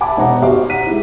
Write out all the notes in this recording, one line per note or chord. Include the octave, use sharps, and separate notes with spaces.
E5 G#5 A5 B5 D6
E1 D#4 C5 F#5 A#5
D#4 F#4 G4 C5 F5 D6
F#5 A#5 B6 D#7
G#3 D#4 E4